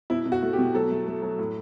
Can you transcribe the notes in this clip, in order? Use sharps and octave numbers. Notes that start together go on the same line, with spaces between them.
B2 E4
B2
F#4
A3
G4
B2
F#3 A4
A3
A3
F#3
A2